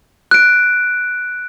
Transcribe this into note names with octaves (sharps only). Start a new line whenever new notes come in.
F#6 D7